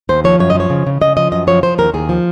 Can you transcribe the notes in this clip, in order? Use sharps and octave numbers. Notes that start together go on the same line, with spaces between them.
D#2 C5
F3 C#5
F#2 C#5
D#5
F3 C#5
C#3
C#3
C#3 D#5
F3 D#5
F#2 D#5
F3 C#5
F3 C5
D#2 A#4
D#2 G#4
F3